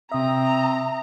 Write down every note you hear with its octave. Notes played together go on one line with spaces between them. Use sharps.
C3 C4 E5 A#5 D#6